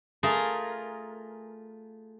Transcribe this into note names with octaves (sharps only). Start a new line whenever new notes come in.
A3 F4 G#4 A#4